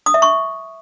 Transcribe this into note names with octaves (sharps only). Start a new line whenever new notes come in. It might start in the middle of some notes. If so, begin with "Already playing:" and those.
D#6
E5
C#6